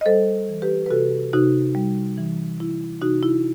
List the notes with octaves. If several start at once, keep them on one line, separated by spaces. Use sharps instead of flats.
D#5
G3 A4 C5
E3
G4 B4
B4
C3 F#4 A4
C3 D#4 F#4
G3
E3
C3 E4
C3 D#4 F#4
E4